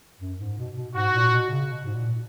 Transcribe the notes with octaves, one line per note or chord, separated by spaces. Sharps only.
F#2
G#2
B2
B2
G#2 F#4
A#2
B2
C#3
B2
G#2
A#2